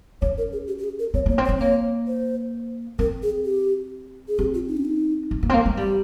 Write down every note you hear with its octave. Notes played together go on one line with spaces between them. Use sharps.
C#4 C#5
A#4
G#4
G4
G4
G#4
A#4
C4 C#5
A#3 C#5
C4
C#5
C4
A#3 C#5
C5
C4 A#4
G#4
G4
G#4
C4 G4
F4
D#4
C#4
D#4
C#4
A#3
C4
A#3
G#3
G3 G4